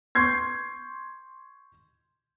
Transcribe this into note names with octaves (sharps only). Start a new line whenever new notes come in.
C6 C#6 G6 G#6 C7